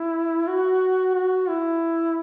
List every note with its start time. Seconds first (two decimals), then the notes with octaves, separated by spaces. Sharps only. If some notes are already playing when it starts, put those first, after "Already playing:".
Already playing: E4
0.47 F#4
1.15 F#4
1.49 E4